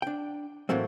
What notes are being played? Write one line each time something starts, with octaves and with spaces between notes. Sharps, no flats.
D4 G5
A2 E3 F#3 A3 A#3 C4